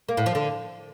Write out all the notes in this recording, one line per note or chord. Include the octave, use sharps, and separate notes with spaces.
A#3
A2
F3
D3